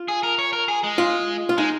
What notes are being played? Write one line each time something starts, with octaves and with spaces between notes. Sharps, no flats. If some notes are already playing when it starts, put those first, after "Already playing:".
Already playing: F4
G#4
A#4
C#5
A#4
G#4
G#3
F4
F4
G#3 D#4